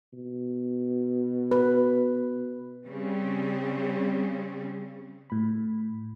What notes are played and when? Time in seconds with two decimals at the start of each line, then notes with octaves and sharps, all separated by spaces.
0.13 B2
1.51 B4
2.86 C#3 G3 C4 C#4
5.30 A2 B5